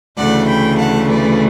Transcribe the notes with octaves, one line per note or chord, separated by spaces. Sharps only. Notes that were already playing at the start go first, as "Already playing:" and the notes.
D2 C#3 E3 A3 D5 F#5
G5 B5
F#5 A5
B4 D5